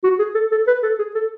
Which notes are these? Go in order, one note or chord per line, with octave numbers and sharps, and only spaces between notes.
F#4
G#4
A4
A4
B4
A4
G#4
A4